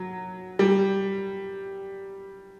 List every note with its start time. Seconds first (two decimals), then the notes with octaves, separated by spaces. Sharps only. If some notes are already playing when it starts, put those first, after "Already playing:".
Already playing: F#3
0.59 G3